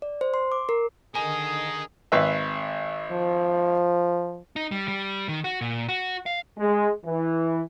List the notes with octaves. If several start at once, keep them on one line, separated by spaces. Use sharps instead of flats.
D5
C5
C6
D6
A#4
D3 D#3 G#4 A#4 D#5 G#5
G#1 B4 E5
F3
D#4
G3
G3
D#3
F#4
A#2
F#4
F5
G#3
E3